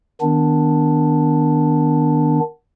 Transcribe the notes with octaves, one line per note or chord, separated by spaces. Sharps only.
D#3 B3 D4